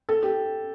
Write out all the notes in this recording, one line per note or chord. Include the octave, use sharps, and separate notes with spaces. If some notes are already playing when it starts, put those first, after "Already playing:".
A4
G4